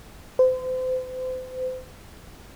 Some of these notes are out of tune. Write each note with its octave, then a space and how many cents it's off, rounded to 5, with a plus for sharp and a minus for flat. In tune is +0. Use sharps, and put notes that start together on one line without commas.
C5 -35